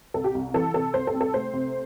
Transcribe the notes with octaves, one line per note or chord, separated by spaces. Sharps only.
C2 A4
G4
C2
E3 A4
C3 A4
C2 C5
A4
C4
A4
A3 C5
C3